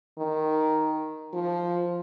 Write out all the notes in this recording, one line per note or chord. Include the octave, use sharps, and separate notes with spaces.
D#3
F3